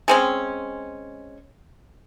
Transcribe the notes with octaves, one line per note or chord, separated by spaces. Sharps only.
G#3 C4 C#4